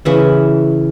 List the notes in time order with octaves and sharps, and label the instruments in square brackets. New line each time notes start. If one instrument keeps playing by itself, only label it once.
[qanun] C#3 E3 E4